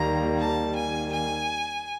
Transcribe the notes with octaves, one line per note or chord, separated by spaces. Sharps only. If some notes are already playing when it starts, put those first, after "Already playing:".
Already playing: D#2 D#3 G3 A#3 A#5
A5
G#5
G#5